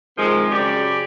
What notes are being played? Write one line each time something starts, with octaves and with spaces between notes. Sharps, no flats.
C3 D#3 F3 G#3
F#2 C#3 G4 C#5 D5